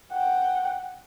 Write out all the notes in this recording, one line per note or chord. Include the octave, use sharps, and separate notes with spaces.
F#5 G5